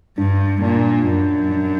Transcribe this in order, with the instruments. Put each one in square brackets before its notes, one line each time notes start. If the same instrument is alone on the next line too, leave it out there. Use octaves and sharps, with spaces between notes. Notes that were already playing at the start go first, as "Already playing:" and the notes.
[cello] G2 [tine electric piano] D4
[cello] A#2 [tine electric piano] D4
[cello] F#2 [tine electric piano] D4
[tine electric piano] D4